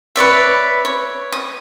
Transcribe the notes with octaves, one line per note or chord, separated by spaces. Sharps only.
B4 C#5 D5 E5
C#5
D#6